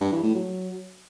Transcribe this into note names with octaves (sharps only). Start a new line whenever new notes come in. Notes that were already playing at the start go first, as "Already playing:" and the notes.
G2
E3
A2
F#3